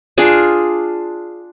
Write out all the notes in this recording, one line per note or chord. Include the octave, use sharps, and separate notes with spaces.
D4 F4 G#4